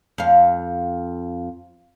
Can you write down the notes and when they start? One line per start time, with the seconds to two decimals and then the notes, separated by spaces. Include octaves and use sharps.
0.18 F2 F5